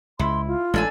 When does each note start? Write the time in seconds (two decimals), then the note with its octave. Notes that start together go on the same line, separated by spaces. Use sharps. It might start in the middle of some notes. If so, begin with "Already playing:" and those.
0.19 C#2 E4 C6
0.47 F4
0.74 A1 G#3 D4 A4 G#5